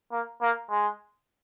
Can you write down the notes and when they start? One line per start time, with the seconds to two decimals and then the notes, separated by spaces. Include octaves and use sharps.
0.12 A#3
0.41 A#3
0.70 G#3